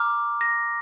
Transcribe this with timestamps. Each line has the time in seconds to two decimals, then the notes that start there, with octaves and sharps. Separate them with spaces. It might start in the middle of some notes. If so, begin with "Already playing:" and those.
Already playing: A#5 D6 F6
0.41 A#6